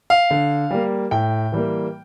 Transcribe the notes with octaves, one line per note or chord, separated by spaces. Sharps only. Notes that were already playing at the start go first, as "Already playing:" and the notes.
F5
D3
G3 A#3
A2 G5
E3 G3 A#3